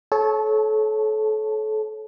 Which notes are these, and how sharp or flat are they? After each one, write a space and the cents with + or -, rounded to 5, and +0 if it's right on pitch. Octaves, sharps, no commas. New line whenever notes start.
A4 -30 C#5 -10 A5 +0